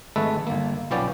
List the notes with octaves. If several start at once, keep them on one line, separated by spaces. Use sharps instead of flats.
G#1 G#3 A3 A4 B4 E5
G1 A#3
B1 F3 B3 C#4 D5 G5